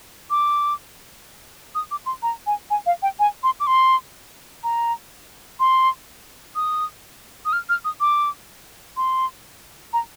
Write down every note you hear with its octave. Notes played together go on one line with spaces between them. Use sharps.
D6
D#6
D6
C6
A#5
G#5
G#5
F5
G5
G#5
C6
D6
C6
A#5
C6
D#6
D#6
F6
F6
D#6
D6
C6
A#5